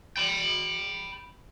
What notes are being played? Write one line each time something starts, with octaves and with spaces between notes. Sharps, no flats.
G5 B5